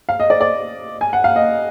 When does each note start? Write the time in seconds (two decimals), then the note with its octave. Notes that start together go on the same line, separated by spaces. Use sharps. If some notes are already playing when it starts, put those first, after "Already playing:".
0.09 F5
0.20 D#5
0.30 D5
0.41 D5
1.01 G#5
1.13 F#5
1.24 F5
1.36 D#5